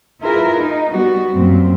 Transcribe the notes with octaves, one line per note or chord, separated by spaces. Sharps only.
E4 F4 G#4 A#4 B4
D#4
G3 B3 F#4
F#2 A#2 C4